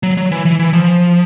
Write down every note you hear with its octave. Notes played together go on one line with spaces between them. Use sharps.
F#3
F#3
E3
E3
E3
F3